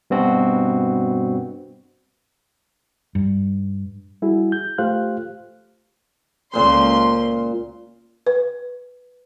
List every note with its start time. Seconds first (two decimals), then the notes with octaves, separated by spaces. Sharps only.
0.10 G2 B2 C4 F#4
3.15 G2
4.22 G3 E4 F#4 G#4
4.52 G6
4.78 A3 F4 G4 C5 F5 F#6
6.54 C#2 A#2 C5 C6
8.27 B4